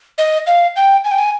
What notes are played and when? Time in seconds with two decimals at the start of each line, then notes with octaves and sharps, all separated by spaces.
0.18 D#5
0.47 F5
0.76 G5
1.04 G#5
1.11 G5
1.18 G#5